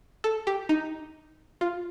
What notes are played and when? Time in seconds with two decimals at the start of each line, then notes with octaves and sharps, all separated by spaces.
0.24 A4
0.47 G4
0.69 D#4
1.61 F4